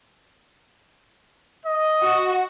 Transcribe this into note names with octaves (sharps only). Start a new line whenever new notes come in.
D#5
F#4